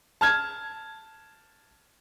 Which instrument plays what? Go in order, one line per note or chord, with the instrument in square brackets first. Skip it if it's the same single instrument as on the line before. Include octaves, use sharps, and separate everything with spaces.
[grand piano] A5 F6 G#6